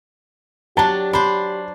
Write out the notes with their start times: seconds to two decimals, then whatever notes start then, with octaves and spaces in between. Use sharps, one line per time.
0.77 F#3 D4 G4 A5
1.13 D4 C5 B5